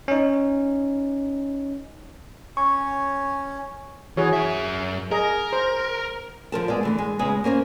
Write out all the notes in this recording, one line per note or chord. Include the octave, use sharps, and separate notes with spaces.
C#4 D#4
C#4 C#5 C#6
E3 F#4 G#4 C#5
F#2 E5
G#4 A#4 D#5 A#5
C5
D3 F3 A#4 A5
G#3 B3 D5
D3 E3 A3
G#3
C#3 G#3 B3 F4
A#3 C#4 A#4 C5